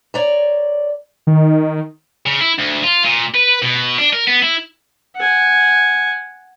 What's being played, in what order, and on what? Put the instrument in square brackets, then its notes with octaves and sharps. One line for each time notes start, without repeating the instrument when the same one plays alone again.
[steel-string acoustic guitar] C#5 D5 A#5
[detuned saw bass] D#3
[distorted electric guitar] C#3
E4
D2
F4
A#2
B4
B2
D4
A#4
B3
E4
[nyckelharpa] F#5 G#5